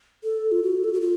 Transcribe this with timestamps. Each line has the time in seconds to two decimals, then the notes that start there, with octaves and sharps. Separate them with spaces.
0.24 A4
0.52 F4
0.63 F#4
0.84 A4
0.93 F#4
1.01 F4